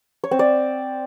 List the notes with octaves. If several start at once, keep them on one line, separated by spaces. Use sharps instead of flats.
C#5
C4
D5